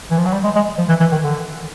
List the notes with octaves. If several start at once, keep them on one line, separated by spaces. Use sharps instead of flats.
E3
F3
F#3
G3
G#3
G#3
F3
E3
E3
D#3
D3